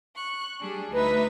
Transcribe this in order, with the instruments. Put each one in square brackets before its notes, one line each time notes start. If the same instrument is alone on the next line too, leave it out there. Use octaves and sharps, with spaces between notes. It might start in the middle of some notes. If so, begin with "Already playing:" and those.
[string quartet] C#6 F#6
G3 D4 G#4
[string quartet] D2 D#4 E5 [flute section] B4